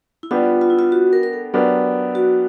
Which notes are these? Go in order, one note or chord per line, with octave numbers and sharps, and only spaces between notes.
E4
G3 B3 D4 F4 G4
F4
E4
F4
F#4
A#4
A#4
A4
F#3 B3 D4 G4 A#4
F#4